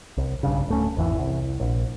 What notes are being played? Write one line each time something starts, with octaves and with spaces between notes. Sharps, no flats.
C2
B1 G2 C#3
D1 A3 C#4
G#1 E2 E3
C2
A#1